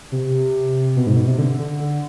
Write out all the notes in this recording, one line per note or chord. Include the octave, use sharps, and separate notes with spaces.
C3
B2
G#2
B2
C3
D3
D3
D3